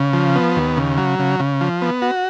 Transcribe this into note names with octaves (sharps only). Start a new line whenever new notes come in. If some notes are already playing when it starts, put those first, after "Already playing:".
Already playing: C#3
F3
B3
D#2
C#3
F#3
C#3
C#3
F3
B3
F#4